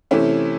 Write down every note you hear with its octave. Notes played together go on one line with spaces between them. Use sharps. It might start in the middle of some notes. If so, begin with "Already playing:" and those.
C3 E3 A3 C#4 E4